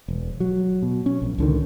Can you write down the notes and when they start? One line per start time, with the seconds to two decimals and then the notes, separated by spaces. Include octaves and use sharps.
0.08 E1
0.40 F#3
0.83 B2
1.06 C#4
1.22 A#1
1.38 C#2 D3 D#3